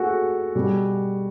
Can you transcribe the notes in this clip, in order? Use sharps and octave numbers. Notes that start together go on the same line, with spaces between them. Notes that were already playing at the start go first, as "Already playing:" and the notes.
Already playing: A3 F#4 G#4 A4
B2 G3